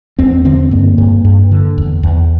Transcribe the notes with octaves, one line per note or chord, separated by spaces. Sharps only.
E2 C4
D3 C4
G2 A#3
G2
G2
D3
E2
E2